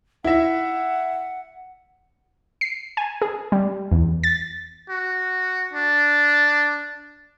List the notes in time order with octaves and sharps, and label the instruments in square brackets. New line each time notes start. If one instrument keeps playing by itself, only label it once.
[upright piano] E4 E5 [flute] F#5
[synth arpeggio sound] C7
G#5
G#4
G3
E2
A6
[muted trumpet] F#4
D4